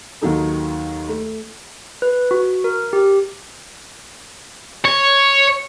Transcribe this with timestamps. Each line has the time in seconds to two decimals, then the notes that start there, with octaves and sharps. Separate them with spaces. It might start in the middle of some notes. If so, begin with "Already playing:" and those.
0.22 D#2 D#3 F#3 D#4 A4
1.09 A3
2.02 B4
2.31 F#4
2.64 A#4
2.93 G4
4.85 C#5